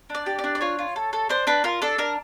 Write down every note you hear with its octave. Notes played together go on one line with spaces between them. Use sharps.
D4 D5
G4
D5
D4
D5
F4 C#5
F4
A4
A4
D4 C5
D4 B4
F4 A#4
D4 A4
D4 A#4